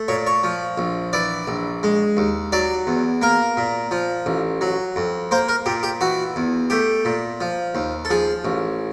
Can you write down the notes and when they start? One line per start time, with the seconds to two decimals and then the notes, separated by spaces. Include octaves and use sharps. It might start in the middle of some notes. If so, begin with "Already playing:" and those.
Already playing: A3
0.08 A#2 C#5
0.27 C#5
0.44 F3
0.78 A#1
1.13 E3 D5
1.48 A#1
1.83 G#3
2.17 D#2
2.52 F#3 D5
2.87 E2
3.22 A#3 A#4
3.57 A#2
3.91 F3
4.26 A1
4.61 F#3
4.96 F2
5.31 A#3 C5
5.49 A#4
5.66 A#2 G4
5.83 G4
6.01 E3 F#4
6.36 E2
6.70 A3 G4
7.05 A#2
7.41 F3
7.75 D#2
8.05 A4
8.10 F3 G#4
8.45 A1